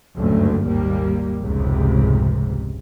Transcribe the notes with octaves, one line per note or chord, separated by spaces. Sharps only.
F#1 D2 G2 A#2 D3 A3
G#1 D#2 G3 A#3
F1 C#2 G#2 C3